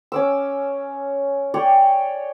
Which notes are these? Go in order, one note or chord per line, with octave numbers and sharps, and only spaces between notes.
C#4 D6 E6
C#5 D5 G5